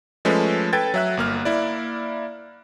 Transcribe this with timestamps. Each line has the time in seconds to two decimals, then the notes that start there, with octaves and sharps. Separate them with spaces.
0.25 F3 G#3 A3 C#4 A4 B4
0.73 A4 B4 G5 G#6 A6
0.94 F#3 E5 F#6
1.17 G1 A#3 F6
1.45 A#3 E4 D5